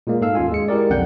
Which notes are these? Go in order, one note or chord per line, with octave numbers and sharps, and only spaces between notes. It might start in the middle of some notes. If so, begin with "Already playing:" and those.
A#2 G#3 A#3
G#2 A4 F5 E6
D#2 C#4 F4 G#5
G#3 C#7
G#3 E4 G4 A#4 D5
B1 F2 D3 F#5 G5 G6